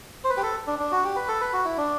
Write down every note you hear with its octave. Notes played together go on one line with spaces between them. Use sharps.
C5
B4
G4
A4
D4
D4
F#4
G4
B4
A4
B4
F#4
E4
D4